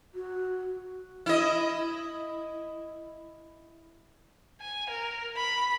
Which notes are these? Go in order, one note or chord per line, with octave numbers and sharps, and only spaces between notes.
F#4
E4 D#5
G#5
A#4
B5